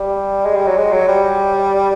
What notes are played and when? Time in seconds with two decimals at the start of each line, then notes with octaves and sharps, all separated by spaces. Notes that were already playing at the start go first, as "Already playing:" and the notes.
Already playing: G3
0.46 G#3
0.56 G3
0.67 F#3
0.77 G#3
0.92 F#3
1.08 G3